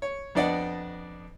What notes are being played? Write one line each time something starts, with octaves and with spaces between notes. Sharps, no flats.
C#5
F2 B3 D4 D5 D#5 F#5